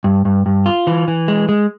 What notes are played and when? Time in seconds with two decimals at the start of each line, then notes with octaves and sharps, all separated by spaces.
0.04 G2
0.25 G2
0.46 G2
0.66 F4
0.87 E3
1.08 E3
1.28 G#3
1.49 G#3